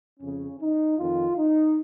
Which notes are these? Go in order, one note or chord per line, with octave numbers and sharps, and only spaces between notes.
F2 C#3 C#4
D#4
F2 D#3 F4
D#4